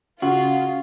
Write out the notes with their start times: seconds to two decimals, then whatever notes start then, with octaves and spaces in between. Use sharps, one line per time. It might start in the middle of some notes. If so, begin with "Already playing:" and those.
0.22 C#3 F4 F#4